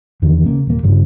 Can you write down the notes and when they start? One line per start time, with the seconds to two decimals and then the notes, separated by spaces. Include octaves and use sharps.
0.22 E2 D3 D#3
0.44 C#3 A#3
0.67 D#1 A#3
0.83 G2 C#3